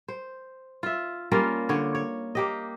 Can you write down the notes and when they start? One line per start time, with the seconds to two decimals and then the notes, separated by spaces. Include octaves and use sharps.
0.08 C5
0.83 F4 E5
1.31 G3 A#3 C#4 F4
1.69 D3 C#5
1.95 C#5
2.35 A#3 G4 D#5